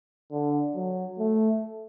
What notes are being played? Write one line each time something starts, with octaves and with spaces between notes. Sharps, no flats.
D3
F#3
A3